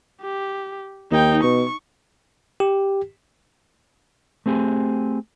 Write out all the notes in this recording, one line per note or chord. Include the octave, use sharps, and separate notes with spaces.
G4
D#2 D#4 G5
B2 C#6
G4
A3 C4 G4 G#4